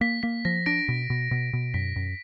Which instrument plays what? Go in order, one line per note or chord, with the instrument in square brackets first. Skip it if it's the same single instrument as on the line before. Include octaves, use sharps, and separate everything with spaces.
[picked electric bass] A#3 [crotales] B6
[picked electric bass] A#3 [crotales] B6
[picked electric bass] F3 [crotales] A#6
[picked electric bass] D4 [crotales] A#6 D7
[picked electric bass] B2
B2
B2
B2
[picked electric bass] F#2 [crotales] B6
[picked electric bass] F#2